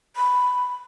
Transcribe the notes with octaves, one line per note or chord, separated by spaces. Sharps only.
B5